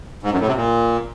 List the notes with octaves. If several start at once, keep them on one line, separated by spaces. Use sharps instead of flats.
G#2
F#2
A2
C3
A#2